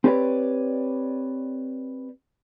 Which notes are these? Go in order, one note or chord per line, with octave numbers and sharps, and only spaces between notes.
C4 G4 B4 C#5 D5